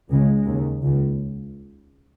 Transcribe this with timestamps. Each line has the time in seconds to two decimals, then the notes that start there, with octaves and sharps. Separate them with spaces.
0.09 C#2 C#3 G#3
0.46 D#2 C#3
0.82 C#2 C#3